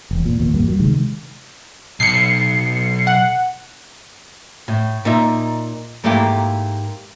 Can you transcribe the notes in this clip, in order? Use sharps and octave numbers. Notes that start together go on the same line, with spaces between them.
E1
A#2
D#2 A#2
G#1 E2 G3 A#3
F#3
C3 D#3 G#3
B1 C7 C#7
F#5
A2
A#2 D#4 E5
G#2 A3 A#3 E4 G4